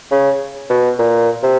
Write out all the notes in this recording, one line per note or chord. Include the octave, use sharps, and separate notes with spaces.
C#3
B2
A#2
C3